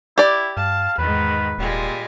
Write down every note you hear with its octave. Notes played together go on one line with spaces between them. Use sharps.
E4 G4 D5
G2 F5 A5
E2 G#2 D#3 B4
D#1 A#2 G3 G#3